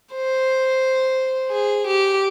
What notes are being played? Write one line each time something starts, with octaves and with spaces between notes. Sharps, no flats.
C5
G#4
G4